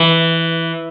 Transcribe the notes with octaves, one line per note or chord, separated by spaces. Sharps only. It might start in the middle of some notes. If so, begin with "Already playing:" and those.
Already playing: E3